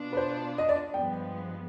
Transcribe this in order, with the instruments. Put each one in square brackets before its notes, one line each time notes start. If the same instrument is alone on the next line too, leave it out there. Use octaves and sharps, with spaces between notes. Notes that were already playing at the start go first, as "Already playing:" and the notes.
Already playing: [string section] B2 B3 D4 F4
[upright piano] B4
C5
D#5
D5
[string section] G2 F3 G#3 B3 [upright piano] G5